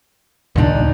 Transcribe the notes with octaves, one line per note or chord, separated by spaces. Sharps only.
D#2 A#2 C#3 D4 D#4